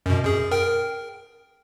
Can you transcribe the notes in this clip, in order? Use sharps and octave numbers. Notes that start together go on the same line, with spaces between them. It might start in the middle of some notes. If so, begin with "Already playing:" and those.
F#2 B2
F#2 G#4
A#4 G5